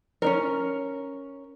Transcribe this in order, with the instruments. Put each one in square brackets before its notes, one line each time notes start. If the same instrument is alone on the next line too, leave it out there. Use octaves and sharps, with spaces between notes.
[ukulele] C#4 D4 A#4